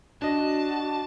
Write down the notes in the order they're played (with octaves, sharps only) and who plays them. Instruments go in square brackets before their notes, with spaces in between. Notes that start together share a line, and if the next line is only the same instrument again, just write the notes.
[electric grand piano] D4 D#5 [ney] F#4 [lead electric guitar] A5